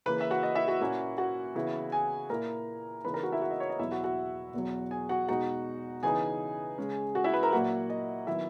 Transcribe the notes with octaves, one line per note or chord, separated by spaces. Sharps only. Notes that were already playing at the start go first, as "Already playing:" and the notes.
C#3 E3 A#3 B4 B5
E5
F#4 F#5
D#5
E4 E5
F#4 F#5
A#2 A#3 C#4 E4
F#4 F#5
C#3 E3 B3 E4
G#4 G#5
A#2 A#3 E4 A#4 A#5
C#3 E3 B3 D#4 B4 B5
A#4 A#5
F#4 F#5
E4 E5
F#4 F#5
D#5
C#5
D#5
E2 B2 F#3 E4 E5
F#4 F#5
F#4 F#5
E2 B2 F#3
G#4 G#5
F#4 F#5
B2 G#3 D#4 F#4 F#5
C#3 E3 B3 D#4 G#4 G#5
C#3 G#3 C#4
F#4 F#5
E4 E5
B4 B5
A#4 A#5
A#2 F#3 A#3 E4 F#4 F#5
D#5
D#3 F#3 B3 E4 E5